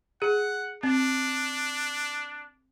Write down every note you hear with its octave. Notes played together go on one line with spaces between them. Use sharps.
G#4 F#5
C4 D4